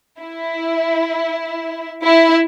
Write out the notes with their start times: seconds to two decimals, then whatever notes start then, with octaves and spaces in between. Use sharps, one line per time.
0.20 E4
2.04 E4